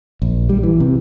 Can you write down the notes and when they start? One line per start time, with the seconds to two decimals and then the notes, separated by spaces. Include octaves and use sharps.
0.22 A#1
0.49 G3
0.63 E3
0.80 C3